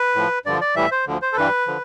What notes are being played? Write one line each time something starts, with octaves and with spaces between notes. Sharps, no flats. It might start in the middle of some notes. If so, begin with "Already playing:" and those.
Already playing: B4
A2 F3
G2 D3 F3 D5
D5
A2 E3 G3 E5
C5
D2 D3 F3
C5
A4
G2 E3 G3 B4
D3 F3